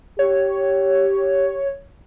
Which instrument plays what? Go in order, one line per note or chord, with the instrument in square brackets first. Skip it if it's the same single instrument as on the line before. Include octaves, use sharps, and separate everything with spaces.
[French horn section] G4 [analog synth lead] C#5